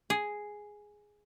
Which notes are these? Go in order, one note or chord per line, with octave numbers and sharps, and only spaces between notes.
G#4